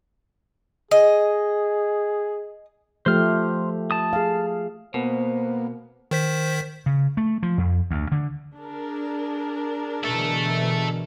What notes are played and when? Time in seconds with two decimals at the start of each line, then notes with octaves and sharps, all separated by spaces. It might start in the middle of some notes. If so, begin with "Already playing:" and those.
0.91 G#4 D#5
3.06 F3 A3 G4 C5 F6
3.91 A5 D#6
4.13 G#4 F5
4.94 B2 A#3 B3 C5
6.11 D#3 C5 B6
6.86 C#3
7.17 A3
7.43 F3
7.58 F2
7.91 D2
8.12 D3
8.57 D4 G#4 A#4
10.04 B2 D3 E3 A4 E5